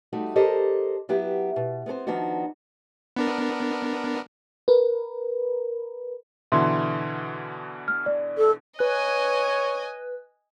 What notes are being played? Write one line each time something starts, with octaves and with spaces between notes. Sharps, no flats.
G3 A3 D#4 F#4
G4 A4 A#4 C5 D#5
F#3 B3 E4 G4
B2
B3 C4 A4 C5
D#3 F3 B3 D4 D#4 F#4
B3 D4 A#4
A#4 B4
B2 D3 E3 E5 C6
F6
D5
A4
B4 C#5 D#5 G#5 F#6